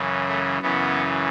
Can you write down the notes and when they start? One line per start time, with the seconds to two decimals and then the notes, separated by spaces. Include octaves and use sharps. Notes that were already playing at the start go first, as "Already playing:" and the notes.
Already playing: F#2 C#3 E3
0.29 A3
0.62 F#2 C#3 E3 B3